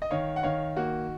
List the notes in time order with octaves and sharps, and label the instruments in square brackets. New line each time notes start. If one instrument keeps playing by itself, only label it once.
[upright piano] D#5
D#3 C#5 F5
F#5
D#3 C#5 F5
A#3 F#4